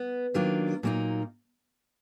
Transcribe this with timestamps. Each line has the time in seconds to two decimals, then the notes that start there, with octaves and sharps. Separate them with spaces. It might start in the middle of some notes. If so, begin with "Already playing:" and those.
Already playing: B3
0.34 D#3 F#3 A#3 D4 F4
0.83 A#2 F#3 A#3 D#4